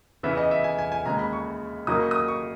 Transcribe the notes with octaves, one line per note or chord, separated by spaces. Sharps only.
C#3 E3 B3 E5
D#5
E5
G#5
G#5
G#5
D#2 C#3 G#3 A#5
B5
C#6
C#3 F#3 A#3 D#4 D#6
C#6
D#6
C#6